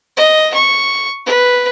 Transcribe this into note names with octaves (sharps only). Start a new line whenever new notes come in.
D#5
C#6
B4